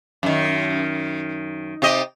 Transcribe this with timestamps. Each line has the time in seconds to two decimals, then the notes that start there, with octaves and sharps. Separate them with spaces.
0.23 F#2 D#3
1.82 C3 G4 D#5